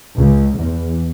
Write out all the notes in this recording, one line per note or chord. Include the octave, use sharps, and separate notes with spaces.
C#2
E2